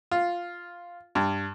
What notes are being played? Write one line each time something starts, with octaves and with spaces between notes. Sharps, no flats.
F4
G2